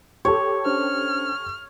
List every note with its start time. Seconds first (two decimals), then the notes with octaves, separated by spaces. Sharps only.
0.25 G4 A4 C#5
0.65 C#4 D4 C5 F6